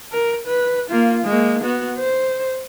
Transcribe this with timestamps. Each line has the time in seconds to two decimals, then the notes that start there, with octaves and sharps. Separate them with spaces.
0.12 A#4
0.46 B4
0.90 A#3 F4
1.25 G#3 A#3
1.62 B3 F#4
1.98 C5